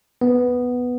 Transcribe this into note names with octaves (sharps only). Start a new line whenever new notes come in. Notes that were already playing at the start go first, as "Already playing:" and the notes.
B3